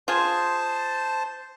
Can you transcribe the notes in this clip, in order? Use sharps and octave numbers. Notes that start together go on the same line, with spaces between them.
F4 G#4 C5 A5